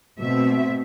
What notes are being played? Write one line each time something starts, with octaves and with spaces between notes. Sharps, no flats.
B2 A3 C4 E5